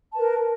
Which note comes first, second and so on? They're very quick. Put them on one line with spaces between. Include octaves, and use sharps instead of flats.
A5 B4 A#4